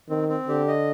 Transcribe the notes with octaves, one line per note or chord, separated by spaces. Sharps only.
D#3 C4
C4
D3 G4
D#5